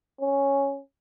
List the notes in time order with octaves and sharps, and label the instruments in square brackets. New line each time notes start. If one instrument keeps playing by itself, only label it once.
[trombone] C#4